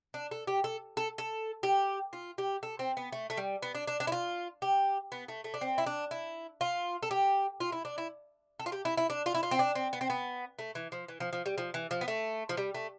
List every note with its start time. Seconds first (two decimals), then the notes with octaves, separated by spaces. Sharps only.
0.14 D4
0.31 A4
0.47 G4
0.64 A4
0.97 A4
1.18 A4
1.63 G4
2.13 F4
2.38 G4
2.63 A4
2.79 C4
2.97 B3
3.12 A3
3.30 A3
3.37 G3
3.62 B3
3.75 D4
3.87 D4
4.00 D4
4.07 E4
4.12 F4
4.62 G4
5.12 B3
5.28 A3
5.44 A3
5.54 D4
5.61 C4
5.78 E4
5.86 D4
6.11 E4
6.61 F4
7.03 A4
7.11 G4
7.60 F4
7.72 E4
7.85 D4
7.98 E4
8.60 A4
8.66 F4
8.72 G4
8.85 E4
8.97 E4
9.10 D4
9.26 F4
9.34 E4
9.43 F4
9.51 C4
9.59 D4
9.75 C4
9.93 B3
10.01 C4
10.10 B3
10.59 A3
10.75 E3
10.92 F3
11.08 E3
11.20 F3
11.33 F3
11.46 G3
11.58 F3
11.74 E3
11.91 F3
12.01 B3
12.08 A3
12.49 F3
12.57 G3
12.75 A3